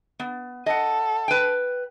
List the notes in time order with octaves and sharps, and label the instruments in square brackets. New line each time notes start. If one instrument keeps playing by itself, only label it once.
[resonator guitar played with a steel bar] B3
[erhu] A4 [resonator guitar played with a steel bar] D#5 F#5
[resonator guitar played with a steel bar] B4 G5